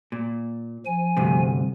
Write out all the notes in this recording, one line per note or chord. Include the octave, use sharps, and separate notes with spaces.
A#2
F3 G#5
D2 G2 C3